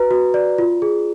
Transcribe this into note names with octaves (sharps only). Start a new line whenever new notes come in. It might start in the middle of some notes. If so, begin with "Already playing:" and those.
Already playing: F#4 B4 A#5
F#4
D5
F4
G#4